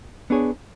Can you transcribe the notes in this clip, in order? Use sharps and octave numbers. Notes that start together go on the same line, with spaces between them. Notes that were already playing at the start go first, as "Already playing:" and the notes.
B3 D4 G#4 C#5